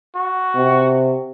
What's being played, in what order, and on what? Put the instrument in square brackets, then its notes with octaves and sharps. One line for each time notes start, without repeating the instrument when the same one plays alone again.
[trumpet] F#4
[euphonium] C3